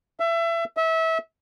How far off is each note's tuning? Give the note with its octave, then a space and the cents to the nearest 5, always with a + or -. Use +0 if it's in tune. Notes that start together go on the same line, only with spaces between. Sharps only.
E5 +25
E5 -25